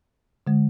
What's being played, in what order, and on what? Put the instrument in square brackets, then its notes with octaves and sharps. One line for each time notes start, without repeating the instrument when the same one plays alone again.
[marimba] D3 G#3